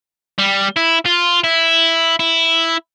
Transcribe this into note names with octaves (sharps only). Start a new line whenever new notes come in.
G3
E4
F4
E4
E4